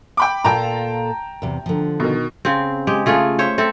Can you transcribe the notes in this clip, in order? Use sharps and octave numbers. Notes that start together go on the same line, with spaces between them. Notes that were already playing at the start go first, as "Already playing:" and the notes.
G5 B5 D6
A#2 F4 A4 G5 A5 A#5
E2 C3
D3 F3
B2 D#3
C#3 C4
G#3 G4
C#3 A3 F4 G#4
C5 C#5 E5
C4 A4 E5